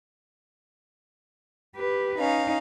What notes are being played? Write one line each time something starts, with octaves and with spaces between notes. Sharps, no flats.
G4 B4
C#4 D#4 F5